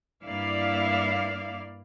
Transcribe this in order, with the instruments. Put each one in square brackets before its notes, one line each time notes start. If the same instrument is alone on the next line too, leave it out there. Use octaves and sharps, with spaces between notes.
[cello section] G2 A#3 E4 D5 F5